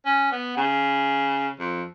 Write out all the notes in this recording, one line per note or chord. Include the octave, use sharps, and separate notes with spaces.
C#4
B3
C#3
F2